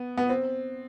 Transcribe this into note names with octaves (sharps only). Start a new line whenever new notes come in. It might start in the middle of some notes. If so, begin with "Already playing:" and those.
Already playing: B3
B3
C4